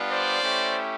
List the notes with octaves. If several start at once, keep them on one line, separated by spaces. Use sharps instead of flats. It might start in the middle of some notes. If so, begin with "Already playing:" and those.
Already playing: G3 B3 D4 F4
C5 D5
A3 C#4 E4 G4